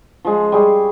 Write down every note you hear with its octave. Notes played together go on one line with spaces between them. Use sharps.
F3 G#3
G3 G#4 C#6